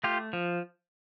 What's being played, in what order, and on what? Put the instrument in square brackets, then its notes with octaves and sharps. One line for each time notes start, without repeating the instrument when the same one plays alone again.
[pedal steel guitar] A3 F4 G4
F3